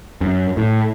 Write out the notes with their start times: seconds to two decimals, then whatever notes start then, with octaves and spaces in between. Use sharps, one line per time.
0.21 F#2
0.57 A2